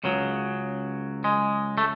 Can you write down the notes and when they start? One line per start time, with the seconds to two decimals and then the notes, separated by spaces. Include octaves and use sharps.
0.04 C#2 C#3 F#3
1.24 G#3
1.78 A3